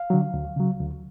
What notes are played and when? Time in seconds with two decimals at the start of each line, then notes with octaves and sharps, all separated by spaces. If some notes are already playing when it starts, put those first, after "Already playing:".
Already playing: F5
0.10 D3 F#3
0.34 D2
0.56 C#3 F#3
0.80 D2